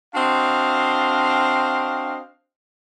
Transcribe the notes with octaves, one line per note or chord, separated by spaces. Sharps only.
C4 D4 F#4 C5 D#5 F5